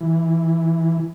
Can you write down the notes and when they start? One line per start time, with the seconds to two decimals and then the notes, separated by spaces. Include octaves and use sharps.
0.01 E3